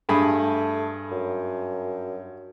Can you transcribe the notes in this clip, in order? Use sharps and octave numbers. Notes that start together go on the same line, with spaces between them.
G2 A3 G#4 B5
F#2